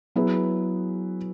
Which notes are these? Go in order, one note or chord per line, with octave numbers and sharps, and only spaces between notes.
F#3 B3 E4 G#4 B4